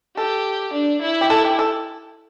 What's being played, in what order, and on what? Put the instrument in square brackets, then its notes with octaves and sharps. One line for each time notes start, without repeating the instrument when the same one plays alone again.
[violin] G4 [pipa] A4
[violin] D4
E4
[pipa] G4
A4
G4
A4